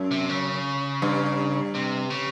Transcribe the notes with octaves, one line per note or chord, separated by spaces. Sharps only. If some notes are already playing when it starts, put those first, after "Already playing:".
Already playing: F#2
C3
C#3
G2
C3
C#3